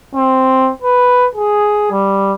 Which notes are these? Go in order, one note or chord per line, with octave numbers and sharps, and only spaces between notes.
C4
B4
G#4
G3